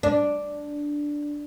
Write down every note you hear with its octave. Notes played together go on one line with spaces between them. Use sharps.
D4